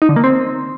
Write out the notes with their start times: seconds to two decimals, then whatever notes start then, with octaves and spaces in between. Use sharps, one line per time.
0.02 D#4
0.09 D3
0.16 A#3
0.24 C4